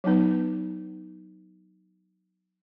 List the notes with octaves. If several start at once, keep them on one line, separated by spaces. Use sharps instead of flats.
F#3 B3 D#4 B4